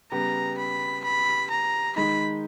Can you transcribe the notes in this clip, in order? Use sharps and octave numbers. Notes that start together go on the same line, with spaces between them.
C#3 G3 B3 G4 A#5
B5
B5
A#5
D#3 G#3 D#4 B5